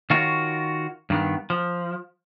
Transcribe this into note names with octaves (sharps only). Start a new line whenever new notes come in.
D#3 F4 F#4 A#4 C#5
G2 D#3 B3
F3